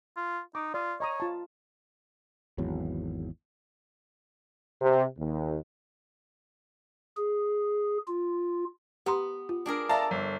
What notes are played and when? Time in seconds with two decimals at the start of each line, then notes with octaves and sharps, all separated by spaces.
0.17 F4
0.55 D#4 D6
0.74 F4 D5 D#6
1.00 C#5 D#5 A#5 D#6
1.20 F4 A5
2.58 G#1 E2 F#3
4.81 C3
5.18 D#2
7.17 G#4
8.08 F4
9.06 B3 G4 A#5 C6
9.49 F4
9.66 D4 G#4 A#4
9.89 A4 D5 E5 F5 A5 A#5 C6
10.11 G1